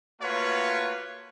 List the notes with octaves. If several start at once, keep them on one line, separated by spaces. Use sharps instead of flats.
A3 A#3 F4 F#4 B4 C#5